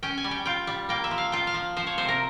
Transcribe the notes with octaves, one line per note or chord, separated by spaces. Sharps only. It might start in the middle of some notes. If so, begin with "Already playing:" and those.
C#4 G5
G#5
G3
G5
F4 G5
G3
A#3 G5
E5
F3
F5
F4 G5
F5
F3
F3 C5
C#5
C3 C5
A#4